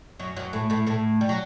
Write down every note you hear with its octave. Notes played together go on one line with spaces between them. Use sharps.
F#2 F#3
F#2 F#3
A2 A3
A2 A3
A2 A3
G3
F#3